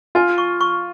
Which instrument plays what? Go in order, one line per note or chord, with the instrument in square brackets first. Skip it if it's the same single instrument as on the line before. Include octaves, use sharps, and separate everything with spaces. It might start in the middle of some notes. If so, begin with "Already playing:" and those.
[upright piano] F4 [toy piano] G#5
[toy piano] C#6
C#6